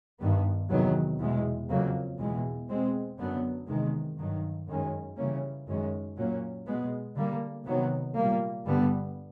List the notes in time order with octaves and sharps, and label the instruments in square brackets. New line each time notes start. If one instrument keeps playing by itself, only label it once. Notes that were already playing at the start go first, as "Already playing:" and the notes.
[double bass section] G2 D#3 G3 B3
E2 C3 D#3 F#3 B3
E2 B2 G#3
F2 C#3 F#3 A#3
E2 B2 G#3
B2 G#3 C4
F#2 D3 F#3 B3
E2 C3 D#3 G#3
G2 D#3 F#3
F#2 D#3 G#3 C#4
C#3 E3 G3 A#3 C#4
F#2 D#3 G#3 C#4
A#2 F#3 A#3 C#4
B2 G#3 B3
D3 G3 A#3
C3 D#3 F#3 B3
A#2 G3 A#3
G2 D3 G3 B3